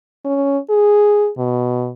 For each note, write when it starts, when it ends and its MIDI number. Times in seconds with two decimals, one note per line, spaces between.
0.25 0.58 61
0.70 1.30 68
1.38 1.91 47